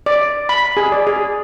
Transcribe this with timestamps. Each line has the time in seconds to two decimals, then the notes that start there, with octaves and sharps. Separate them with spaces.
0.06 D5
0.49 B5
0.77 G#4
0.92 D5
1.07 G#4